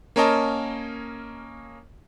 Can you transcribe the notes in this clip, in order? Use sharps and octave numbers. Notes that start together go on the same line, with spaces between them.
A#3 C#4 A#4 C#5 D#5 A5